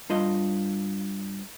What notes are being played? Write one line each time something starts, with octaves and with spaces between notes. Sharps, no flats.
G2 F4 D#5